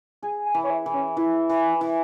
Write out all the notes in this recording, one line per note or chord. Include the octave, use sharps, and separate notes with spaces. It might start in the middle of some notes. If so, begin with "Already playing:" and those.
G#4 G#5
G#5
E3
C#5
E5
E3
C#4
E3 E4
E3
E3